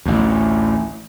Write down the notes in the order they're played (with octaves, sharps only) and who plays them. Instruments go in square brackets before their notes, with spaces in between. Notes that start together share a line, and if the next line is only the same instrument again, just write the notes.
[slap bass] A1 D2